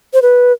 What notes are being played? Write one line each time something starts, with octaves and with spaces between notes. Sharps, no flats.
C5
B4